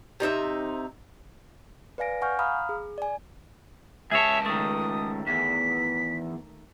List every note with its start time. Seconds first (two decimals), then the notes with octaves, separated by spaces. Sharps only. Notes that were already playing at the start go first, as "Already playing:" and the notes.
0.20 C3 D#4 A4 E5
1.98 B4 D5 F5 G#5 A#6 D7
2.21 F#5 G#5 C#6 F6 G6
2.39 F5 A#5 B5 D#6 F6
2.69 G#4
2.98 D5 G#5
4.11 C#2 G#4 C#5 E5 A5
4.46 D#3 A3 D#6
5.27 E2 B6